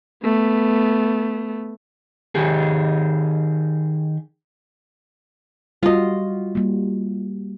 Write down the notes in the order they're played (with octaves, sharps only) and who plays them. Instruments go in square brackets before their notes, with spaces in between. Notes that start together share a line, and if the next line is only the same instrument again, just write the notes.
[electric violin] A3 B3
[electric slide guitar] D#3 G4 G#4
[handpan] G3 F#4 [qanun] F4 D#5
[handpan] G3 A#3